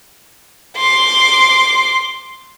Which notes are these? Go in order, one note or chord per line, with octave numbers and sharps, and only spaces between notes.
C6 D6